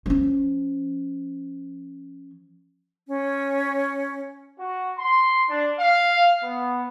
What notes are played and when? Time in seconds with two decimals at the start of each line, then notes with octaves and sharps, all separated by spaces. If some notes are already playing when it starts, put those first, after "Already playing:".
0.06 F3 C#4
3.08 C#4
4.58 F#4
4.97 C6
5.48 D4
5.78 F5
6.43 B3